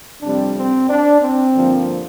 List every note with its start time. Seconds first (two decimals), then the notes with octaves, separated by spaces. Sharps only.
0.22 F2 C3 G3 C4 D4
0.56 C4
0.88 D4
1.22 C4
1.55 G2 D3 F3 A#3